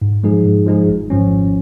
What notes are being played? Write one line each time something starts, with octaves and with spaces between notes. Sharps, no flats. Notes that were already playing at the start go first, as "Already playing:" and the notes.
G#2
F3 G#3 D#4 G#4
G#2
F3 G#3 D#4 G#4
G#1
G#2 F3 C#4
G#1